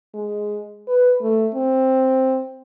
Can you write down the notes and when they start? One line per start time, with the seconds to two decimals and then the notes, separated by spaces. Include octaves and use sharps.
0.14 G#3
0.88 B4
1.22 A3
1.55 C4